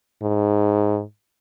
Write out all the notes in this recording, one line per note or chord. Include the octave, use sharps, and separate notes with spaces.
G#2